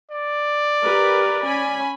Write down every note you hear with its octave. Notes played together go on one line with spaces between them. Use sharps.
D5
G4 A#4 B4
C#4 G#5 B5